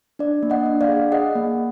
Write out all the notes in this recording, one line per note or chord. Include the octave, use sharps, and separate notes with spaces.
D4 D5
A#3
D#5 F#5
D4
D5 F5
G#4
G#4 D#5 F#5
A#3